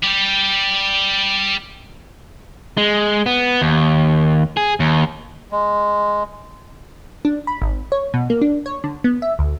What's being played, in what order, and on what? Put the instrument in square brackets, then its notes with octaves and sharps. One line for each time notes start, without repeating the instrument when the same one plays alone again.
[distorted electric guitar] G3 G4
[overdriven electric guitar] G#3
B3
D#2
G#4
D#2
[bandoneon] G#3
[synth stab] D4
B5
G#1
C#5
B2
A#3
D4
C#5
D3
B3
E5
D2